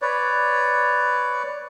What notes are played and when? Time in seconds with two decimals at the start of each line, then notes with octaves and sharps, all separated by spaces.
0.02 B4 C#5 D5